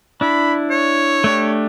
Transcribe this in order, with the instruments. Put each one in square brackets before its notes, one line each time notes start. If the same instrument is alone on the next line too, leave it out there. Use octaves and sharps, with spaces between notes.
[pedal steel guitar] D4 E4 [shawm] B5
[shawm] C#5
[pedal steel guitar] A3 D4 G4